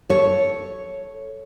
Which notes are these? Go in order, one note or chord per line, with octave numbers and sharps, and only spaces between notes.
A4 C#5